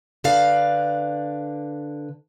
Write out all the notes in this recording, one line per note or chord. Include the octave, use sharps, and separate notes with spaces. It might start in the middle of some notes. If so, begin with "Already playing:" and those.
D3 B4 D5 F5